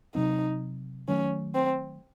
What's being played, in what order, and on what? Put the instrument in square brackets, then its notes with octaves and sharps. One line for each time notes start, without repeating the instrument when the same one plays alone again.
[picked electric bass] C3 F#3 C4 [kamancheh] D#4
[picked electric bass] D#3 F#3 A3 [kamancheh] C#4
[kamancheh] C4